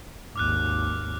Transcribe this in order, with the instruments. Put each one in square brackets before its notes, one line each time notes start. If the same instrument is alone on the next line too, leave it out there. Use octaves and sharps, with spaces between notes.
[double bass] G#1 D#2 [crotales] D6 F6 F#6